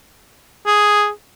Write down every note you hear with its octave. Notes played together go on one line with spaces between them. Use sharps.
G#4